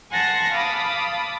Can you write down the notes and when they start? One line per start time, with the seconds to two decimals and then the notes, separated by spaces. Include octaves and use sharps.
0.12 F#5 G#5 A5 C6 A#6
0.53 F5 A5 B5 D6 D#6